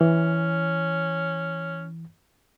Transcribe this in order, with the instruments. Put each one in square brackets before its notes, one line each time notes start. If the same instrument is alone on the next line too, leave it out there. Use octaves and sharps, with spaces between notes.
[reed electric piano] E3 [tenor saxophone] C#4